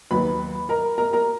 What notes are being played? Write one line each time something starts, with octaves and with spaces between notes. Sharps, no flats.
D#2 D#3 F#3 B4 B5
A#4 A#5
A#4 A#5
A#4 A#5